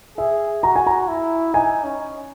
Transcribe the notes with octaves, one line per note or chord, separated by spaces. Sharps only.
G#4 E5
F#4 A#5
G#5
A#5
E4
D#4 G#5
C#4